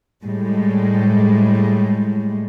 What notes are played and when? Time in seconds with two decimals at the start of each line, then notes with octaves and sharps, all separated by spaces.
0.23 A2 G3 G#3